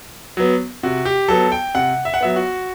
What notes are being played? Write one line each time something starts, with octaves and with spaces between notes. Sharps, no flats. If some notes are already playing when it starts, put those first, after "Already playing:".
F#3 B3
C3 F#4
G4
F#3 B3 A4
G5
C3 F#5
E5
F#5
F#3 B3 E5
F#4